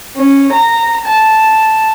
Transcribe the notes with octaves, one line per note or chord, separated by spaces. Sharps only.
C#4
A#5
A5